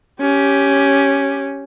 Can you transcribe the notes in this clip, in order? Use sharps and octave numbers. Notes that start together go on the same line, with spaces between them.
C#4 G4